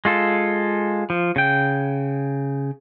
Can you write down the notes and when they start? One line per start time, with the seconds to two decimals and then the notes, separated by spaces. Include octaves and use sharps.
0.05 G#3 F4 A4
1.10 F3
1.36 C#3 G5